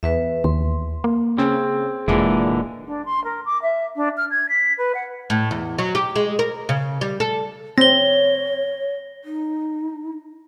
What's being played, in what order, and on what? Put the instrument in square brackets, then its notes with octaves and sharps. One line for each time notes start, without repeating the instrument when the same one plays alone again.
[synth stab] E2 [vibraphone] B4 E5
[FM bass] D#2 [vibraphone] C6
[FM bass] A#3
[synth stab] C#3 [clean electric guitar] C4 [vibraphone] G#4
[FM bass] E1 [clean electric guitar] A#2 D3 E3 [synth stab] G#3
[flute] D4
C6
A#4
D6
E5
D4
F6
G#6
B6
B4
F#5
[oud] A2
E2
F#3
G4
G#3
A#4
C#3
G3
A4
[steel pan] C4 [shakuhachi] C#5 [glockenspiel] A#6 G7
[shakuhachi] D#4